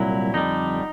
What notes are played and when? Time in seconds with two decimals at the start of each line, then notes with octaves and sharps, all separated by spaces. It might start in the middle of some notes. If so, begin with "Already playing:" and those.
Already playing: C2 A#2 F#3 E4
0.34 F2 D3 G3 D#4